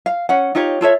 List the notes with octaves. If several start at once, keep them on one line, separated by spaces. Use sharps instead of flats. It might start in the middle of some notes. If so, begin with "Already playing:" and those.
F5
C#4 F#5
D#4 F4 G4 C#5
F4 A4 C#5 E5